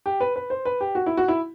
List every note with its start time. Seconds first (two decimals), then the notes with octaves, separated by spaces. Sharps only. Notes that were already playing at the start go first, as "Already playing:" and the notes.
0.06 G4
0.20 B4
0.36 B4
0.50 C5
0.65 B4
0.81 G4
0.95 F#4
1.06 E4
1.17 F#4
1.28 E4